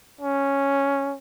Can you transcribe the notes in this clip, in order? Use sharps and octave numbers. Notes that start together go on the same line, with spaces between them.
C#4